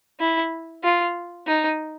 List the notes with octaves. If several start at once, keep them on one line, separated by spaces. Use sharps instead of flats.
E4
F4
D#4